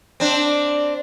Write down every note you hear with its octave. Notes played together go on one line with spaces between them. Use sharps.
C4 D4